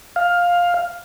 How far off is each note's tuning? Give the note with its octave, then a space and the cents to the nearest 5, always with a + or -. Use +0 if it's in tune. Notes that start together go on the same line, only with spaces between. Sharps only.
F5 +10